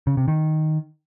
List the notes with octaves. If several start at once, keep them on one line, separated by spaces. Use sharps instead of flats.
C#3
C3
D#3